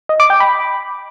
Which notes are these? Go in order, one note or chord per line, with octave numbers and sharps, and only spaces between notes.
D#5
D6
G5
B5